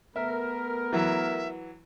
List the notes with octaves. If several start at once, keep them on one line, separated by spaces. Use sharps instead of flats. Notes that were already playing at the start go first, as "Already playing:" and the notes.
A3 B3 A#4 E5
E3 F#3 E5